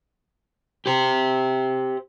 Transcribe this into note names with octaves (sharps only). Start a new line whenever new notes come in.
G4 C5